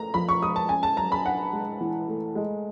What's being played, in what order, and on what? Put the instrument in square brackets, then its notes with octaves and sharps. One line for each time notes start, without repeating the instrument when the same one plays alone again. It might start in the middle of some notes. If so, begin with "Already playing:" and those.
Already playing: [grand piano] A3 [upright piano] A#5
[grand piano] F3 [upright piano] B5
[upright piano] C#6
[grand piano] G#3 [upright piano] D#6
[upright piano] A5
[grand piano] C#4 [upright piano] G#5
[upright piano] A5
[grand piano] F#3 [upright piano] A#5
[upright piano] B5
[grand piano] D4 [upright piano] F#5
[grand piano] G#3
E3
A3
G#3